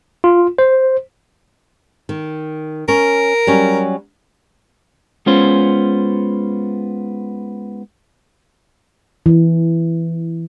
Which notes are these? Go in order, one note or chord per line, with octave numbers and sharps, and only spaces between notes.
F4
C5
D#3
C#4 A#4
F#3 G3 C#4
G#3 B3 C#4 F4 C5
E3